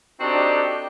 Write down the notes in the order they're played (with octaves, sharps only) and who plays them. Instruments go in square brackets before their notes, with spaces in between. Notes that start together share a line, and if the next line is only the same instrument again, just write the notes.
[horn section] C4 D4 D#4 F#4 G4 A4